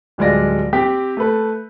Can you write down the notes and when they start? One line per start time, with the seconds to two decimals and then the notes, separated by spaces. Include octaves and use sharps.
0.18 D1 G3 G#3 F4 D5 A#6
0.73 C4 G4 G5 B6
1.17 A3 A4 B4